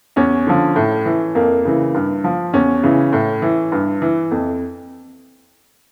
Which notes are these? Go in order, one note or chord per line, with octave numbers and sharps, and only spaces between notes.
E2 C#4
D3 F3
A2
E3
F2 A#3
C#3 E3
G2
F3
E2 C#4
C#3 E3
A2
E3
G2
E3
F2